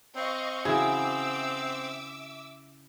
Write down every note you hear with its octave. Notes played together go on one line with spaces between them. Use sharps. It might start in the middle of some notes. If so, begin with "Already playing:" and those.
C4 D#5 F5 C#6
C#3 E3 F#4 G#4 E5 D6 E6